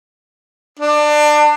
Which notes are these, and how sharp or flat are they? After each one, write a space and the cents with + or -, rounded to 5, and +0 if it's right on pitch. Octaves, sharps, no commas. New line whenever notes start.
D4 +25